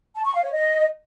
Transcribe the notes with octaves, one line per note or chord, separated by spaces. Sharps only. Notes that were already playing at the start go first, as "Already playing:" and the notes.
A5
C#6
F5
C#5
D#5